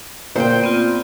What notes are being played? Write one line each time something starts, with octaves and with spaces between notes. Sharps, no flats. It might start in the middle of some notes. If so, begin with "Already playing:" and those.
A#2 C5 G5
B3 C4 F4